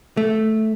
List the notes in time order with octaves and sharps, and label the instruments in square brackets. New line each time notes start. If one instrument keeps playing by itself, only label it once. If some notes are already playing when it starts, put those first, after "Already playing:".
[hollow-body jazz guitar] A3